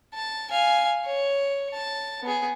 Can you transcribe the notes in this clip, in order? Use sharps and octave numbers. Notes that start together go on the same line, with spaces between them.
A5
F5 G#5
C#5
A5
B3 G#4